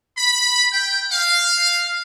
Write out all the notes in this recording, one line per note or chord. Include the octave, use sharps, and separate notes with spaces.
B5
G5
F5